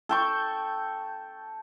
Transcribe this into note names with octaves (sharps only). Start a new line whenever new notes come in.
A4 G5 C#6